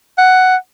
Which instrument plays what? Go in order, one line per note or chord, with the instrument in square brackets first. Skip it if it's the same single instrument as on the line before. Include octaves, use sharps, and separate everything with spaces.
[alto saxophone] F#5